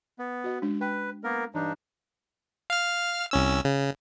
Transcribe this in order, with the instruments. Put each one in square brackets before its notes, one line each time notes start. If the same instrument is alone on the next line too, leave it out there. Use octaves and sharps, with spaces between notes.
[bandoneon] B3
[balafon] F#4 D#5
G#3 C#4 D4
[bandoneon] B4 [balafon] G5
[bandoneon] A#3 B3 A#4
[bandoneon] G2 D4 D#4 [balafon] E3
[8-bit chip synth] F5 F6
C2 C#4 E6
C#3